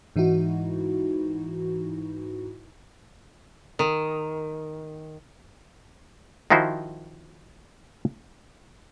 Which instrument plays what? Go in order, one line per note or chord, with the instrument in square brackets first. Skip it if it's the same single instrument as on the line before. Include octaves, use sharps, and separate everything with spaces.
[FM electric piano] G#2 E3 D#4 E4 F#4
[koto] D#3
[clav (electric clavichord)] D#3 F3 D#4 E4 F#4 C5